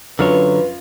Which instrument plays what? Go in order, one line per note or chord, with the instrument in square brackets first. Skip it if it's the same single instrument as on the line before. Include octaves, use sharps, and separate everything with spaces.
[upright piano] F#2 F4 F6 [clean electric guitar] D3 F#3 C#5 [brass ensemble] B4